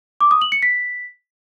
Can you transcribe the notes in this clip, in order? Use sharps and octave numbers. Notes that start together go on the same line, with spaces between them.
D6
D#6
F#7
C#7
B6